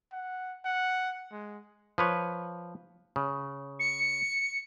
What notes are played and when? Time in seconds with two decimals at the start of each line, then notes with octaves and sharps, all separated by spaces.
0.12 F#5
0.65 F#5
1.32 G#3
1.98 F3 B4 C#5
3.16 C#3
3.79 C#7